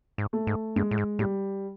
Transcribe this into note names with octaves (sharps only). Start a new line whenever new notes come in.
G#2
A3
G#2
G2 G#3
A2
G#2
A2 G3